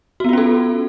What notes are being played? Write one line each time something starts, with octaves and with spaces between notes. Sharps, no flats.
B3 C#4 F4 F#4 A4